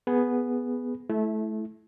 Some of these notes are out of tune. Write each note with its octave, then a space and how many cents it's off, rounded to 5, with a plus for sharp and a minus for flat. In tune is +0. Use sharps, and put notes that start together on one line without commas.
B3 +0 G#4 +0 B5 +0
A3 -25 E4 +0